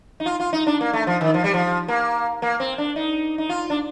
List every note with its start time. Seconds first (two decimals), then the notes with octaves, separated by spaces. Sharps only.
0.20 D#4
0.26 F4
0.40 F4
0.53 D#4
0.67 D4
0.81 A#3
0.93 A3
1.07 F3
1.21 D#3
1.34 F3
1.44 G3
1.54 F3
1.88 A#3
2.42 A#3
2.60 C4
2.78 D4
2.96 D#4
3.38 D#4
3.49 F4
3.70 D4